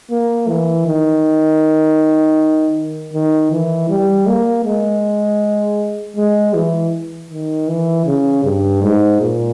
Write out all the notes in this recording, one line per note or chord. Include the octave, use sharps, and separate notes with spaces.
A#3
E3
D#3
D#3
E3
G3
A#3
G#3
G#3
E3
D#3
E3
C#3
G2
G#2
A#2